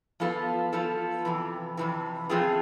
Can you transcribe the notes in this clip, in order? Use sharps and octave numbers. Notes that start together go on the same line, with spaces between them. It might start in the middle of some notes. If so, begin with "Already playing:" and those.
F3 B3 F4 A4
F3 B3 F4 A4
F2 C3 E3
F2 C3 E3
F3 A3 C4 F4 G#4